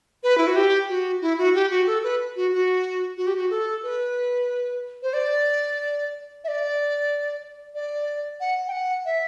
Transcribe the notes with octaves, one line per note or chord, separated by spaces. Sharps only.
B4
E4
F#4
G4
F#4
E4
F#4
G4
F#4
A4
B4
F#4
F#4
F#4
G4
F#4
A4
B4
C5
D5
E5
D5
D5
F#5
G5
F#5
E5